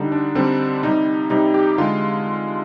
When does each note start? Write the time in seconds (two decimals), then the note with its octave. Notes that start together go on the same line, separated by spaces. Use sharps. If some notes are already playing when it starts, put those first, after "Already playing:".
Already playing: D3 G3 D#4
0.12 D4
0.35 D3 G3 C4
0.83 C3 G3 D#4
1.30 C3 G3 D#4
1.54 G4
1.78 D3 G#3 F4